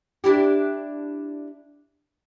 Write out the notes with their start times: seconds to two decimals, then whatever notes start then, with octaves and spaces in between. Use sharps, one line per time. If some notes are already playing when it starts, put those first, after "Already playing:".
0.24 D4 E4 G4